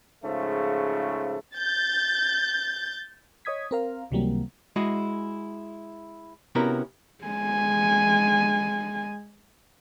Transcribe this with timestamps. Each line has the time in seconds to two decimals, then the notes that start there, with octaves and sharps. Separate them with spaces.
0.24 G#2 C#3 F3 A3
1.56 G6 A6
3.45 C#5 D#5 D#6 G#6 B6
3.71 C4 A#4 F5
4.11 C#2 C3 E3 F#3 G3 A#3
4.76 G#3 E4 F#4 G#4
6.55 C3 B3 C#4 E4 F#4 A#4
7.25 G#3 G#5